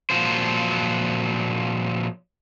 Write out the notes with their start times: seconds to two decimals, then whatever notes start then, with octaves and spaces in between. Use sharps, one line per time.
0.10 A#2 F3 F#3 F4 C5